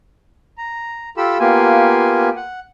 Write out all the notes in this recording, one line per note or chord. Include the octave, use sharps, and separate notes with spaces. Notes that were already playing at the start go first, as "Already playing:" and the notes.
A#5
F4 G4 A4 B5 E6
A#3 B3 F4 G4 G#5
F#5